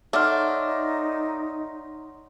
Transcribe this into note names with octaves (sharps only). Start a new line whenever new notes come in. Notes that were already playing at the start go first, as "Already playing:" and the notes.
D#4 A4 C#5 D5 E5 F#5 C6 F6